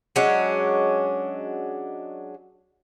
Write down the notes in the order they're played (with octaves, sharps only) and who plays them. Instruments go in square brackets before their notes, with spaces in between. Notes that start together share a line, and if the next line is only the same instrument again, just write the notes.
[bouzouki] F#3 G#3 C#4 D4